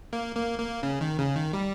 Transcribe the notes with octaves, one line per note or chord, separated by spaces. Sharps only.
A#3
A#3
A#3
C#3
D#3
C#3
D#3
G3